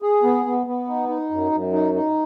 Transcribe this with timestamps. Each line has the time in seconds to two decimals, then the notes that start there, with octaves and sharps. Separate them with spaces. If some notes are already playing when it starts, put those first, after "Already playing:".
0.02 G#4
0.23 B3
0.45 B3
0.67 B3
0.87 D#4
1.09 D#4
1.31 F#2
1.52 F#2
1.73 D#4
1.94 D#4